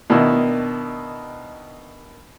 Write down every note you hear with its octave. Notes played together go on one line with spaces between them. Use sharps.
B2 D#3 D4 E4